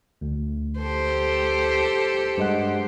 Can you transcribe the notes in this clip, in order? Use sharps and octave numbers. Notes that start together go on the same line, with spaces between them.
D2
G4 A4 C5
G2 G#3 F#5